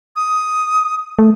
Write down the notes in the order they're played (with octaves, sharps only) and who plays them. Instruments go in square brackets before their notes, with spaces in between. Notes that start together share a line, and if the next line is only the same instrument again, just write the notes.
[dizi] D#6
[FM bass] A3